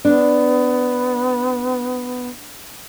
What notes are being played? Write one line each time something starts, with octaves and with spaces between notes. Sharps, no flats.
B3 D4